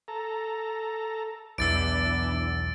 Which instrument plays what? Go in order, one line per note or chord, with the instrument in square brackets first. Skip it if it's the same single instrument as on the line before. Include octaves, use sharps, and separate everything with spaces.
[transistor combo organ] A4 A#5
[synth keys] B1 E2 [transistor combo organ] E3 D4 [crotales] E6 A6 D7